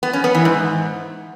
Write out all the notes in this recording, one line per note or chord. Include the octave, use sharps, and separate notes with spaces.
B3
C#4
B3
E3
G#2